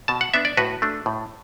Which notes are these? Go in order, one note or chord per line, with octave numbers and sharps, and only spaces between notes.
B2 A5
F#5
B3 D4 E5
D5
A2 F#4 B4
A3 D4
A2